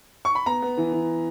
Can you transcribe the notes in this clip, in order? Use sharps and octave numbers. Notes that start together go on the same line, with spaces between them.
C#6
B5
B3 A#5
B3
E3
E3